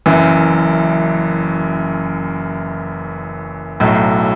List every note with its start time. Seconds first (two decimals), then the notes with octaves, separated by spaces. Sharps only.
0.06 F#1 F#2 E3
3.80 B1 A2 F#3